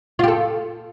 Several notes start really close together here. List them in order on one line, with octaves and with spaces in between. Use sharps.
F4 G4 A4